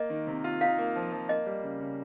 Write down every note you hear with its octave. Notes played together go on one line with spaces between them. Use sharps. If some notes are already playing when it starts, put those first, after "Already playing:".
Already playing: A#3 D#5
D#3
C3
F4
D#4 F5
A#3
F3
F3
A#3 D#5
G3
C#3
C#3